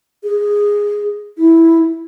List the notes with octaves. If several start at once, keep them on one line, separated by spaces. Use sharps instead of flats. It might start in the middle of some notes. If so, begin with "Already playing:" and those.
G#4
E4